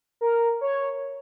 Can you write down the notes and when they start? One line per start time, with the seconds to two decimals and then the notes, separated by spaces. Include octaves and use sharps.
0.21 A#4
0.61 C#5